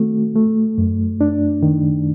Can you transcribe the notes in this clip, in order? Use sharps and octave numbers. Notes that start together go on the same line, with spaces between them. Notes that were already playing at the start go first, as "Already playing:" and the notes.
Already playing: D#3 A3 C4 F#4
A3
F#2
D4
D#3